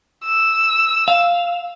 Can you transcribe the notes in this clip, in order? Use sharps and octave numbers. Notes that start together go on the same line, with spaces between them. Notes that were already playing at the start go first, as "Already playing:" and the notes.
E6
F5